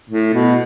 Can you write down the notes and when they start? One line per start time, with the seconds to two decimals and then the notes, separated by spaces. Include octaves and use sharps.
0.10 A2
0.33 B2